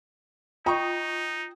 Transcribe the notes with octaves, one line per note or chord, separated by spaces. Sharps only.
D#4 F4 D#5 G5 C#6 D#6